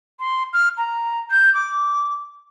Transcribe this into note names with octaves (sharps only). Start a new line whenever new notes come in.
C6
F6
A#5
G6
D6